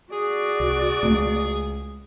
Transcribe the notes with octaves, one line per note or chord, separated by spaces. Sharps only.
F#4 G#4 D5
C2
C#2 G#3 A3